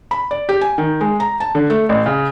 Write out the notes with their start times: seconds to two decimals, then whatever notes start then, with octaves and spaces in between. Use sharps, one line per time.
0.11 B5
0.31 D5
0.49 G4
0.61 G#5
0.78 D#3
1.01 G#3
1.20 A#5
1.40 A5
1.55 D3
1.70 A3
1.89 A1
2.06 C#3